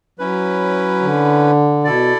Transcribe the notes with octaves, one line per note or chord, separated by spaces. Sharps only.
F#3 C#4 E4 B4
D3
B2 E4 A4 D5